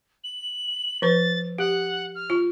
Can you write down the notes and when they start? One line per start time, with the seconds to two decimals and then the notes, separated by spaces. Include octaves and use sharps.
0.24 F#7
1.02 F3 B4 A6
1.58 G4 F#5
2.15 F6
2.30 F4